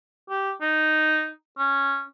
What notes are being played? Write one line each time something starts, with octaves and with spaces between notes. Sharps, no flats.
G4
D#4
C#4